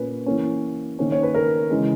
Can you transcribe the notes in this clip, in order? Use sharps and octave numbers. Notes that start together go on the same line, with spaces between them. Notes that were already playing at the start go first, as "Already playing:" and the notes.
Already playing: A#2 A#3 C#4 B4
E3 A#3 C#4
D#3 A#3 C#4
C#5
B4
A#4
C#3 E3 G#3